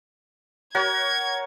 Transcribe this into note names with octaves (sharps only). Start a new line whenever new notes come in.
F#4 A#4 C#5 G#6